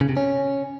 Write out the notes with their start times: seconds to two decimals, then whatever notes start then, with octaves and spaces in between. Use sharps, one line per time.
0.01 C#3
0.09 C3
0.17 C#4